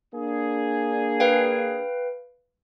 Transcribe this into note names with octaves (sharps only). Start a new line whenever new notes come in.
A#3 D4 G#4
B4 F5 G5